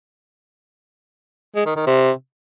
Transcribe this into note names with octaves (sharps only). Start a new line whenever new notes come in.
G#3
D#3
D#3
C3